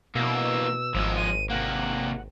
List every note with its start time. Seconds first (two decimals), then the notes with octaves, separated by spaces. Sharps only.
0.15 B2 E3 A#3 E6
0.95 G#1 F3 G#3
1.17 D#7
1.50 C3 A#3 F#5